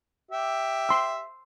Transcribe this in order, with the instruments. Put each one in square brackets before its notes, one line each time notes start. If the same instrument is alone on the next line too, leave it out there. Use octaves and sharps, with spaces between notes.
[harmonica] G4 E5
[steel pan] C6 E6